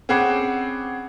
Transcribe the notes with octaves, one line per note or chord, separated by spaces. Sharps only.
C4 C#4 G#4 F#5 B5 D6